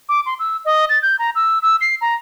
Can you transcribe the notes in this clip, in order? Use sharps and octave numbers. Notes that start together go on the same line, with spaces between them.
D6
C6
E6
D#5
A6
G6
A#5
E6
E6
C7
A#5